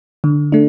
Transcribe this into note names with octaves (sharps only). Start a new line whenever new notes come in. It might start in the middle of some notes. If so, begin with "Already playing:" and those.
D3
A3 D4